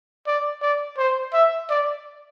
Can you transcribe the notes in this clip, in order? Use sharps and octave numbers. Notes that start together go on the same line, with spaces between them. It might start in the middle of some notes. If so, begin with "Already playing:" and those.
D5
D5
C5
E5
D5